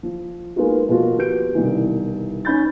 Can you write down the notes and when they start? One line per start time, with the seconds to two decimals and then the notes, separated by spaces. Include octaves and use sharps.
0.03 F3
0.56 G#3 A#3 B3 D#4 F4 F#4
0.89 B2 F3 A#3 F4 F#4
1.17 F3 B3 F#4 G4 G6 D7
1.55 C2 B2 D#3 E3
2.45 C#4 D#4 B5 G6 A6